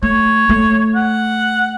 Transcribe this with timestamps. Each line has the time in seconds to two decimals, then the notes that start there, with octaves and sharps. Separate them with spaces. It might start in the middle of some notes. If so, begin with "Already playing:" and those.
0.03 A3 C#5
0.49 A3
0.95 F#5